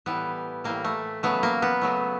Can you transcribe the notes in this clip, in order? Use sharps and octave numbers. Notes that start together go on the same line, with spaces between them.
A2 E3 G3 B3
A2 E3 G3 A#3
A3
C#3 F#3 A3 B3
A#3
B3
C#3 F#3 A3